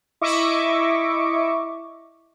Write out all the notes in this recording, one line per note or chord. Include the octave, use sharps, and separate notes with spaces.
E4 D#5 E5 C#6 D6